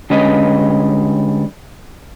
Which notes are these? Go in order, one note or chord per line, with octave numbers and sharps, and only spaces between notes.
D3 G3 G#3 C#4 B4 D#5